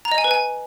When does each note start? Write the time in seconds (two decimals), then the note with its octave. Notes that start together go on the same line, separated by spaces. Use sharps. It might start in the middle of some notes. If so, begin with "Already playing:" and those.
0.05 A#5
0.12 D#5
0.18 G#5
0.24 B4
0.31 G#5